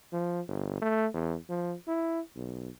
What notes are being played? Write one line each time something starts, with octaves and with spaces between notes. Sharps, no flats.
F3
G1
A3
E2
F3
E4
B1